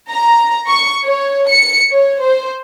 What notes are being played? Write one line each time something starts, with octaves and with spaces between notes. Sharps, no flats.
A#5
C#6
C#5
C#7
C#5
C5